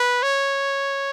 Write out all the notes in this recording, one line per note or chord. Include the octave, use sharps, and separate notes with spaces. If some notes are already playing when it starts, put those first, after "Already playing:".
Already playing: B4
C#5